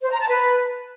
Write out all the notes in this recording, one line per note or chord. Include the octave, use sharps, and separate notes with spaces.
C5
A#5
A5
B4